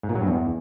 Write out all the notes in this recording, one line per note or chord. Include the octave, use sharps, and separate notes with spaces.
G#2
A#2
F#3
G2
E2